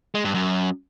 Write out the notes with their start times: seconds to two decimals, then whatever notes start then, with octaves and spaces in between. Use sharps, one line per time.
0.15 G#3
0.25 G2
0.34 F#2